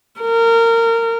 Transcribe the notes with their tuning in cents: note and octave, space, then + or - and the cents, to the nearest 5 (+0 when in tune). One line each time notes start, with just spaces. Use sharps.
A#4 -25